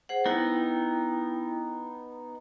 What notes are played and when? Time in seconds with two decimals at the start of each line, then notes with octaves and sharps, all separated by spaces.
0.09 G#4 C5 F#5
0.26 B3 D#4 E4 G5